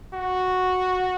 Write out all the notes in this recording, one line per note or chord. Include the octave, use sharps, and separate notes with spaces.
F#4